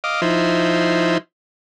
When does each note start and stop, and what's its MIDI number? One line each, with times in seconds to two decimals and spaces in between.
0.04 0.21 75
0.04 0.21 77
0.04 0.21 86
0.22 1.18 53
0.22 1.18 63
0.22 1.18 64
0.22 1.18 72